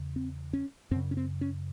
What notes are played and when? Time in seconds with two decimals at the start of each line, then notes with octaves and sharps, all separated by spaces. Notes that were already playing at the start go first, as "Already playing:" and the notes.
Already playing: E2 C#3
0.16 C4
0.53 C#4
0.91 F#2 C4
0.96 C#3
1.11 C#4
1.17 C4
1.41 C#4